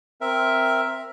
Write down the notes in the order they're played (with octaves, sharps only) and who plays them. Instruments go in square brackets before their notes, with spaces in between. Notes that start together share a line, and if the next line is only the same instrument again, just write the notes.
[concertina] C4 A#4 E5